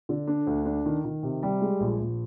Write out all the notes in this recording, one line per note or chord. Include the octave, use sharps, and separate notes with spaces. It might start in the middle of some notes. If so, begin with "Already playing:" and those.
D3
D4
D2
D4
D#3
D#3
C3
G3
G#3
A#1
A#1